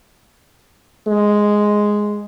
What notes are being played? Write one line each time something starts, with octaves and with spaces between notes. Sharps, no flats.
G#3